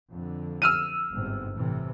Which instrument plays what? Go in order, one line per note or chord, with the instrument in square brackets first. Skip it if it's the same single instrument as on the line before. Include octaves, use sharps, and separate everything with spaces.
[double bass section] F2 D3
[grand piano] E6 F6 D#7
[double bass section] G1 G#2 C3
A2 C3 E3